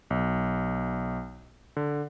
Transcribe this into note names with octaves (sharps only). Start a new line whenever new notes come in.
B1
D3